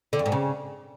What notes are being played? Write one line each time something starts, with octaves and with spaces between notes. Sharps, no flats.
D3
F2
G#2
C#3